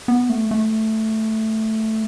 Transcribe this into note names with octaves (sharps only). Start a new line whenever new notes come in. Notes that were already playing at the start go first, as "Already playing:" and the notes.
B3
A3
A3